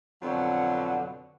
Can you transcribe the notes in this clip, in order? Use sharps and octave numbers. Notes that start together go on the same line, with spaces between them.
F2 B2 D3 F#3